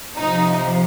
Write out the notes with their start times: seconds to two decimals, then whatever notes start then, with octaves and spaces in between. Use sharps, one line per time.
0.17 C3 F3 D#4